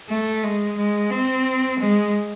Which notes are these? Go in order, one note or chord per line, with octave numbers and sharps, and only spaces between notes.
A3
G#3
G#3
C4
G#3